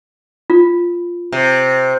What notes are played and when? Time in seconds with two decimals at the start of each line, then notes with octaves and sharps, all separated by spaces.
0.50 F4
1.32 C3